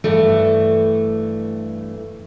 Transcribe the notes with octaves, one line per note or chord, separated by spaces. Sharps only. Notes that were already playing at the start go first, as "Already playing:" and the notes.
G2 E3 A3